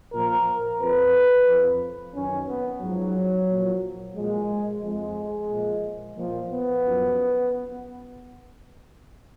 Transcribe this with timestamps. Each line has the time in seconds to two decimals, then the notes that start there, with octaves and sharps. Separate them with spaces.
0.13 A#2 F3 A#4
0.80 F2 F3 B4
1.47 F2 F3
2.14 F#2 D#3 C#4
2.48 B3
2.81 G#2 F3 F#3
3.48 A#2 F3
4.16 A#2 F3 G#3
4.83 F2 F3 G#3
5.50 A#2 F3
6.17 A#2 F3
6.50 B3
6.84 F#2 F3